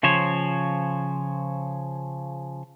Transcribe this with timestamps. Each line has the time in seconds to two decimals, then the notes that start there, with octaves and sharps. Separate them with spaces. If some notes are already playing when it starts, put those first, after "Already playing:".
0.03 C#3 F3 C5 C#5